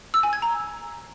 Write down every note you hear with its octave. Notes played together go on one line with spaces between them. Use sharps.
E6
G#5
G#6
A#5